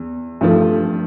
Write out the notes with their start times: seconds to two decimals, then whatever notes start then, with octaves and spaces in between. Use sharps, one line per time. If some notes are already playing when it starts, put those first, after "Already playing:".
Already playing: E2
0.41 G2 F3 A3